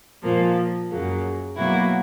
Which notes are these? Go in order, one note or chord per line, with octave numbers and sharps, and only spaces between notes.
A#2 F3 A#3
F#2 C#3 F#3 A#3
B2 F#3 A#3 E4 F#4